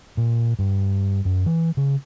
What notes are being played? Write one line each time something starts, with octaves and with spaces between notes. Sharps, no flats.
A#2
G2
F#2
E3
C#3